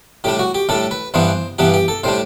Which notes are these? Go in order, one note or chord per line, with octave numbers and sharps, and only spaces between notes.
A2 G3 D4 G4
F#4
G4
A2 G3 D4 A4
B4
G2 E3 B3 D4 C5
G2 E3 B3 D4 G4
G4
A4
A2 G3 D4 C5